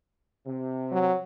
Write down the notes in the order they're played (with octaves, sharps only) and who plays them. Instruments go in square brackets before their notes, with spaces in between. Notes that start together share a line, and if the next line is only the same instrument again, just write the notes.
[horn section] C3
[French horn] F#3